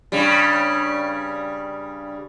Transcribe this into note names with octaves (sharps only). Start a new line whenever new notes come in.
G2 C#3 G3